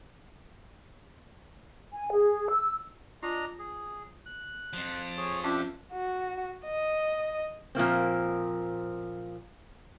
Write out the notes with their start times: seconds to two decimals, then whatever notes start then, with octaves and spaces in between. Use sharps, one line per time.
1.93 G#5
2.12 G#4
2.50 E6
3.23 D4 F4 D#5 A#5
3.59 G#4
4.26 F#6
4.73 F2 F3
5.17 G#4 C#5
5.44 C#4 D4 F4 G4 E5 A5
5.93 F#4
6.65 D#5
7.75 A#2 F3 A#3 C4